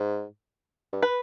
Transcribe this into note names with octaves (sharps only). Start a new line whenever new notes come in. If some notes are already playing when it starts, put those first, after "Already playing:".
Already playing: G#2
G2
B4